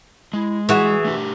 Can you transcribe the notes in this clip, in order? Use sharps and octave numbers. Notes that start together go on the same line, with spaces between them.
G#3 E4
E3 F#4 G#4
A3 D4 G4